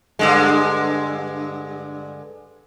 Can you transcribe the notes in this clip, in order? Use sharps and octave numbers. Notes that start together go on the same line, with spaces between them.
G2 D3 G#3